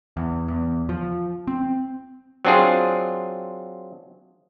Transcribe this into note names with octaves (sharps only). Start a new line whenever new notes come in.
E2
E2
F3
C4
F#3 C4 D4 F4 G#4